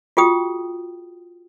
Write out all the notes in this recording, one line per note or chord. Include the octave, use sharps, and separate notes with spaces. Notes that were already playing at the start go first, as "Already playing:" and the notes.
F4 F#4 G#4 G5 D#6